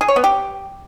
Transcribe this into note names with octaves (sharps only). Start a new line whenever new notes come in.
G#4
C#5
B3
G4